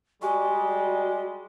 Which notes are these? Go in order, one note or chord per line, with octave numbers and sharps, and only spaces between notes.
G3 G#3 F#4 G#5 C#6